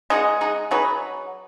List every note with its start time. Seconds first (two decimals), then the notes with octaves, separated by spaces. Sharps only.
0.10 G#3 D#4 G#4 D#5 F#5
0.41 D#4 G#4 D#5 F#5
0.71 F#3 D#4 G#4 B4